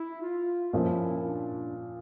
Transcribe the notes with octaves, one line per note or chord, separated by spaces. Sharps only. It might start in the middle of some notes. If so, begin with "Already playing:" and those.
Already playing: E4
F4
A#2 F3 C#4 E4
D4